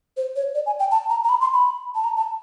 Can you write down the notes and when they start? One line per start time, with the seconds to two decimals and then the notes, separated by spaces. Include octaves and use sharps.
0.17 C5
0.36 C#5
0.55 D5
0.66 G#5
0.80 G5
0.91 A5
1.10 A#5
1.24 A#5
1.29 B5
1.41 C6
1.54 B5
1.95 A5
2.04 A#5
2.17 A5